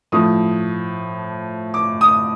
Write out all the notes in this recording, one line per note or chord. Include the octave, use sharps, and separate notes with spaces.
A2 F3 D#6
D6
D#6